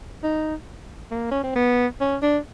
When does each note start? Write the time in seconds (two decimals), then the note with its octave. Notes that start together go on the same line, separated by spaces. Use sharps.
0.24 D#4
1.11 A#3
1.31 C#4
1.44 C4
1.56 B3
2.01 C#4
2.22 D4